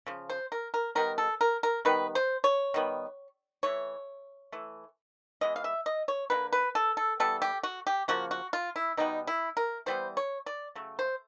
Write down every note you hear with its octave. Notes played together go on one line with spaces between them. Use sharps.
C#3 F3
C5
A#4
A#4
D#3 G3 B3 A#4
A4
A#4
A#4
D#3 G3 B3 B4
C5
C#5
D#3 G3 B3
E3 A3 C#5
E3 A3
E3 G#3 B3 D#5
F5
E5
D#5
C#5
D3 G3 A#3 B4
B4
A4
A4
E3 G3 B3 A4
G4
F#4
G4
C#3 F3 A#3 F#4
F#4
F4
E4
B2 G3 B3 D#4
E4
A#4
E3 G3 B3 C5
C#5
D5
C#3 F#3 A3
C5